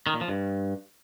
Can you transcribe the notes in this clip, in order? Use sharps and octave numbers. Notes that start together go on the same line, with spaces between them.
D#3
A#2
F3
G2